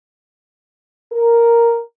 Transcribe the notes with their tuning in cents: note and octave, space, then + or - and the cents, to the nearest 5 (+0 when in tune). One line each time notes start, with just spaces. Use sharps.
A#4 +0